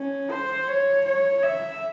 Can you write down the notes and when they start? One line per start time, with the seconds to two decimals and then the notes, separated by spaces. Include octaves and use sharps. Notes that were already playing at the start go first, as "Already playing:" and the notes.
Already playing: C#4
0.31 C5
0.68 C#5
1.05 C#5
1.43 E5